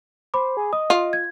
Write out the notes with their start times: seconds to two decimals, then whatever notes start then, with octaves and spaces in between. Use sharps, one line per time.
0.34 C5 B5 D6
0.57 G#4
0.73 D#5 D#6
0.90 F4
1.13 G#6